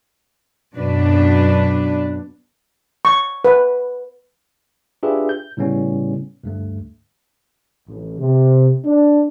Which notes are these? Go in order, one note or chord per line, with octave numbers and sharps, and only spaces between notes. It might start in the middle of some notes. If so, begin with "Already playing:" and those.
F#2 B2 D4 B4
C#6
B4
D4 F4 G4 G#4 B4 E5
G6
A2 C#3 G3 B3 C#4
D2 G2 A3
A1
C3
D4